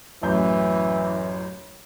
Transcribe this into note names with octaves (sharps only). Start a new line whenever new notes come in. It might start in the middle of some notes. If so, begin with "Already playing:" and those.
A1 F#2 E3 G6